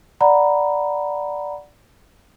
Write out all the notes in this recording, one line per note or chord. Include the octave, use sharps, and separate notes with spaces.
D5 F#5 A#5 B5